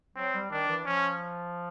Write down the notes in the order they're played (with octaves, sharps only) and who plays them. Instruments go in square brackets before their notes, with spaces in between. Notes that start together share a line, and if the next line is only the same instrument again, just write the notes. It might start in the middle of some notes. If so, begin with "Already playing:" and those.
[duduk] F#3 [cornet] C4
[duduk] G3
[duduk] D#3 [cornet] D4
[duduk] E3
[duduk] F3 [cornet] C#4